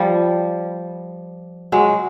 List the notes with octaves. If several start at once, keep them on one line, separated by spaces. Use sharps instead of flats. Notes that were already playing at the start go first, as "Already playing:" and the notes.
Already playing: F3 G3
F#3 G#3